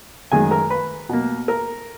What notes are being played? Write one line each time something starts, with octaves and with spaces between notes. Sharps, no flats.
F#2 D#3 G#3 G#4 G#5
A#4 A#5
B4 B5
B2 A#3
A#4 A#5